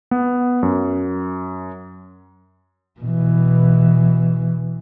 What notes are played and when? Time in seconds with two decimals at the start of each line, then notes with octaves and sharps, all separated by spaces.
0.11 B3
0.63 F#2
3.00 B2 E3